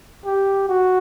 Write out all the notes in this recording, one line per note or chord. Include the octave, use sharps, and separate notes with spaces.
G4
F#4